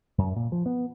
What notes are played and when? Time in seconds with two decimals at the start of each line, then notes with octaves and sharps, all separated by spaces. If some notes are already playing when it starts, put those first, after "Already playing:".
0.18 F#2
0.36 A#2
0.52 F3
0.66 B3